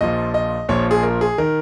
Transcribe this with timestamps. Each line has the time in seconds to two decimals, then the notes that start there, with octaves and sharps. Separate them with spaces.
0.01 A#1 A#2 F3 D#5
0.34 D#5
0.69 A#1 A#2 F3 C#5
0.91 G#4
1.03 A#4
1.21 G#4
1.38 D#3 A#4